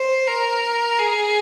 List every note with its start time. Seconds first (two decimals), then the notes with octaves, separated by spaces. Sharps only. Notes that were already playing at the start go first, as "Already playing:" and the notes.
Already playing: C5
0.27 A#4
0.99 G#4